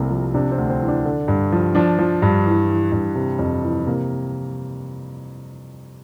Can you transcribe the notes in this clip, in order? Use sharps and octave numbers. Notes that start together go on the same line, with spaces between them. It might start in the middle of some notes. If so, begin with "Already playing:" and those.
Already playing: C2 C3 A3 A#3
F3
C3 D4
C4
D2
C4
E3
D4
D3
G2
F3
F3 D4
F3
G2
E3
E3
G2
C3
F2
E3
C3 A#3